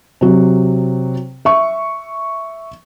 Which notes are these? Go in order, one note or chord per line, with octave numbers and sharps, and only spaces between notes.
C3 F#3
E5 C#6